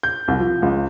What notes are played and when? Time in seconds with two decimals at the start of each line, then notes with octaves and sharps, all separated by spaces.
0.03 G6
0.28 C2
0.40 F3
0.62 C#2